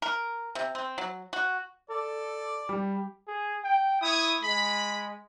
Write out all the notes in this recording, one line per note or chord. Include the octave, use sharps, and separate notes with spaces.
A#4
C3
C4
F#3
F#4
A4 D5
G3 G4
G#4
G5
E4 C#5 D#6
G#3 B5